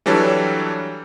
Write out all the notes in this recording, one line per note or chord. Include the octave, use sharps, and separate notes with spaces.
E3 F#3 G3 D4 A4 C#5